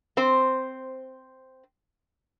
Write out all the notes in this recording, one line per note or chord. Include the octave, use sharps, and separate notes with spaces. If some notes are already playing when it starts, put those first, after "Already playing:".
C4 C5